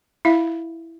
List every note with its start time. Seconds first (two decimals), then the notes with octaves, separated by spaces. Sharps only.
0.25 E4 E5 F5